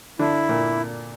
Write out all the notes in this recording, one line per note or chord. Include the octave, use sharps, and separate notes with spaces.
D3 D4 E4
A#2 A#3